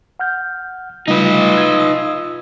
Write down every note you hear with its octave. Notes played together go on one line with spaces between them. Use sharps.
F#5 F6 G6
C#3 G3 A3 D#4 F4 B4 D#5
E6 G#6